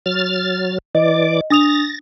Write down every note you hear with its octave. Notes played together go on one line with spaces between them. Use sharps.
F#3 F6 A6
E3 D5 D#5 D6
D4 D#6 A6 A#6 F7